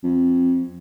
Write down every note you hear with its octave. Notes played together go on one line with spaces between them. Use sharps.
F2